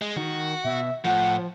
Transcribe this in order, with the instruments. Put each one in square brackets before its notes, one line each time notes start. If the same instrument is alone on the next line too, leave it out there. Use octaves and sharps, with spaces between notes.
[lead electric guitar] G#3
[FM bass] D#3 [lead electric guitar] F#4
[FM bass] B2 [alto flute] E5
[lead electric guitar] A2 [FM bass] F3 [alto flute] F#5